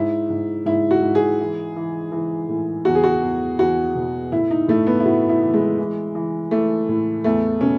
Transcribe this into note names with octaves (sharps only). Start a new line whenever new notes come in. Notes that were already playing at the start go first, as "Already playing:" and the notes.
Already playing: G#2 E4
G#2
G#2 E4
F#4
G#2
G#4
E3
E3
E3
A2
E2 F#4
G#4
F#4
E2
E2 F#4
B2
A2 E4
D#4
A2 A3
B3
E4
A2 F#4
E4
E3
G#3
E3
E3
E3 A3
A2
E2 A3
B2 C#4